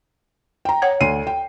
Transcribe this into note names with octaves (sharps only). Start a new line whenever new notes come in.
G5 A#5
C#5 F#5 G#6
D2 C7 D#7
G5